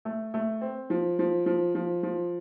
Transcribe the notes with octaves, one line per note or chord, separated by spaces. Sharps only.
A3
A3
C4
F3
F3
F3
F3
F3